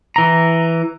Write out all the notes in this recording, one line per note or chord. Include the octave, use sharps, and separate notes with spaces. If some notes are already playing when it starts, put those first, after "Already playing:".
E3 A#5